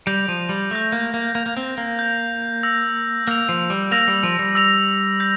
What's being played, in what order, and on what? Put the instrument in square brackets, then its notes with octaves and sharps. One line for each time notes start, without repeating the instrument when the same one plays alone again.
[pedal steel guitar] G3 [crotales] G6 A#6 F7
[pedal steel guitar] F3
G3
[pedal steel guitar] A3 [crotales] G6 A#6 F7
[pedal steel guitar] A#3
A#3
[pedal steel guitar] A#3 [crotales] G6 A#6 F7
[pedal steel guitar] A#3
C4
A#3
[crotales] G6 A#6 F7
E6 A#6 F7
[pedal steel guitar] A#3 [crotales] E6 A#6 F7
[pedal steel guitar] F3
G3
[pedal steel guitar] A#3 [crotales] E6 A#6 F7
[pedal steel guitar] G3
F3
G3
[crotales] E6 A#6 F7
G6 A#6